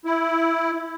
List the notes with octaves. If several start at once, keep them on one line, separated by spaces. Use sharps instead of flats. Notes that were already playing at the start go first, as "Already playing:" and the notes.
E4